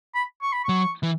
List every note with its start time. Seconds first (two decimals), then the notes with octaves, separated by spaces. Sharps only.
0.14 B5
0.42 C#6
0.52 B5
0.65 F#3 C#6
1.03 E3